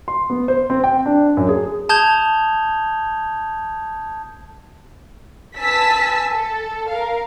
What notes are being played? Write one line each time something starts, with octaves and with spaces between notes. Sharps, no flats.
C6
B3
C5
C4
G5
D4
F#2
G#4
A5 D#6 G6 G#6 F7 G7
B4 G#5 A5 E6 B6
A4
A#4 F5